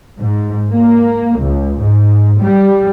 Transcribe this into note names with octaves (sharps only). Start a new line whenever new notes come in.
G#2
A#3
C#2
G#2
G3